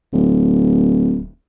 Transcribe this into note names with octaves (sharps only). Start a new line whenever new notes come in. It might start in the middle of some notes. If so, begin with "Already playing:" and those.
D1